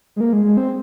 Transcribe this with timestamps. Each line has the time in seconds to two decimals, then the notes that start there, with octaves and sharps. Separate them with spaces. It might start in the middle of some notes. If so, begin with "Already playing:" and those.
0.16 G#3
0.21 A#3
0.33 G#3
0.45 G#3
0.57 C4